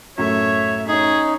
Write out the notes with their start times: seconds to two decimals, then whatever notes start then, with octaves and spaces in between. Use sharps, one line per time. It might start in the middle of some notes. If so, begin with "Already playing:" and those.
0.18 F#2 A2 A3 C#5 E5
0.88 C#4 D#4 G#4 C#5